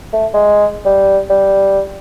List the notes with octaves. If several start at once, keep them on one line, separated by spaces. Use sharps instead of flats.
A3
G#3
G3
G3